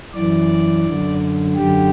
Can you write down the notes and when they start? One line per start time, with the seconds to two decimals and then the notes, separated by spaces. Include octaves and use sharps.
0.14 F#2 E3 D5
0.85 F#2 D3
1.55 F#2 D3 G4